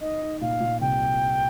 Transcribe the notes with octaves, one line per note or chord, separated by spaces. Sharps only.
D#4 D#5
D#4
A#2 F5
A#2
C2 G5